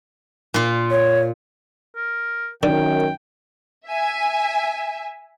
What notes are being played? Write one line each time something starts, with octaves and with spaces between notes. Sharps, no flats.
A#2 F4
C#5
A#4
F#2 D3 D#3 G5
E5 G#5